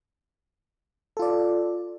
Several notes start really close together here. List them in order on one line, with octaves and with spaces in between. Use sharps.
A4 F4 D5